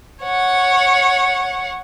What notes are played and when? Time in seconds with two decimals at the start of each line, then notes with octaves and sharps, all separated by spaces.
0.23 C#5 F#5